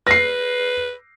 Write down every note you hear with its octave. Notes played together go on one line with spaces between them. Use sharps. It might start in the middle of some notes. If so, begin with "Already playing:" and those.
B4 A#6 C7